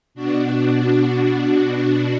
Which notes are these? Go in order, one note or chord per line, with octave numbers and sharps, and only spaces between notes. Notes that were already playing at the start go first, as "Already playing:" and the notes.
B2 D4 F#4